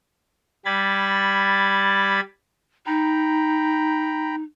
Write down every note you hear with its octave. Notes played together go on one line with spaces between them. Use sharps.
G3 B5 G#6 A6
D#4 G5 A#5 B5